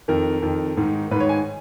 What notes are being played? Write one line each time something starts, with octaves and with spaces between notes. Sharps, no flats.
F2 D#3 A#4
F2 D#3
G#2 D#3
G#2 D#3 B4 C#5
G#5